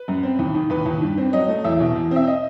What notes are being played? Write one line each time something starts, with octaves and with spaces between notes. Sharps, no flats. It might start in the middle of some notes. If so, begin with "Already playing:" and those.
Already playing: B4
F#2
C4
D#2
D#3
D#2 B4
D#2
G2
C4
F#3 D#5
A3
E2 E5
B2
E2
C4 E5
D#5